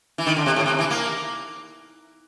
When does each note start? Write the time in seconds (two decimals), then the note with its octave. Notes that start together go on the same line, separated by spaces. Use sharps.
0.18 E3
0.27 D#3
0.37 D3
0.46 C3
0.56 A2
0.66 C3
0.79 E3
0.91 A#3